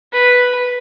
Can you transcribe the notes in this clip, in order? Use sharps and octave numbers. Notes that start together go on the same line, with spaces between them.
B4